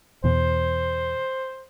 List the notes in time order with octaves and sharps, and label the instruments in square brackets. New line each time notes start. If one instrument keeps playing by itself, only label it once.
[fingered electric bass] E2 B2 [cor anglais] C5